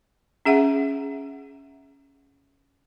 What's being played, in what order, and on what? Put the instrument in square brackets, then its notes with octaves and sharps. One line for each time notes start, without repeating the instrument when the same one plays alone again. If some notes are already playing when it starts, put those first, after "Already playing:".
[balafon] C#4 G#4 E5 F#5